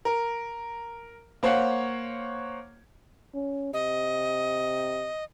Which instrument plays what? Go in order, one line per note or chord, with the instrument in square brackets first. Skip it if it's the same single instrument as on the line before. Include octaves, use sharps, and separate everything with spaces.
[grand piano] A#4
A#3 C5 C#5 F5 F#5
[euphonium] C#4
[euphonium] C3 [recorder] D#5